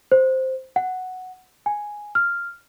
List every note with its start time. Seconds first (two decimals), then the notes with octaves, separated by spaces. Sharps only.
0.12 C5
0.76 F#5
1.66 G#5
2.15 F6